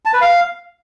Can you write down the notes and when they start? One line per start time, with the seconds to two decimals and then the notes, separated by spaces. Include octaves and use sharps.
0.05 A5
0.13 B4
0.21 F5